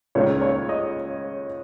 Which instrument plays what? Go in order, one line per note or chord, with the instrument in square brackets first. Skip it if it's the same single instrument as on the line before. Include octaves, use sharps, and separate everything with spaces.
[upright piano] C#2 C#3 A#3 D#4 C#5
C#5
D#5